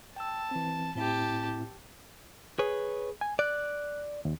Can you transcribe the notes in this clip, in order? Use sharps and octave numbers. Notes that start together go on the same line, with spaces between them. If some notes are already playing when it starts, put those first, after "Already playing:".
G5 A5 E6
E3 C4
A2 C4 E4 G4 A5
G#4 B4 C#5
G#5
D5 F#6
D#2